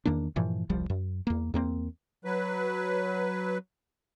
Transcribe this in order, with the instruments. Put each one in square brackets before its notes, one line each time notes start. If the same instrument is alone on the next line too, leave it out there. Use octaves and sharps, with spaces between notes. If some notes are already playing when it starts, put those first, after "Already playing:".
[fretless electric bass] E2 D#3 A#3 D4
G2 A#2 E3 F3
E1 C2 F3 G3
F#2
E2 A#3
E2 A#3 C4
[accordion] F#3 B4